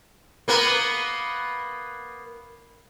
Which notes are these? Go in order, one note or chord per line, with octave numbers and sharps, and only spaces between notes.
A#3 B3 A#4